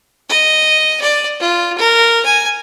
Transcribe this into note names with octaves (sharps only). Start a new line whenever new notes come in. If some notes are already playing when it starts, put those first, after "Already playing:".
D#5
D5
F4
A#4
G#5